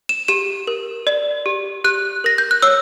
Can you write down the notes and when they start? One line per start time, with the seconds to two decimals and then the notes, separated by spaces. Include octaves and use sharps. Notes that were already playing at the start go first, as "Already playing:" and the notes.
0.09 E7
0.28 G4 E7
0.67 A#4
1.07 D5
1.46 G4
1.84 G4 F#6
2.24 A#4 A#6
2.38 G6
2.51 F#6
2.62 C#5 E6